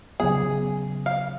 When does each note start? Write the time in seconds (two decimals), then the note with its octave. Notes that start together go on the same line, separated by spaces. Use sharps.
0.20 C#3 F#3 B3 G#4
1.06 F5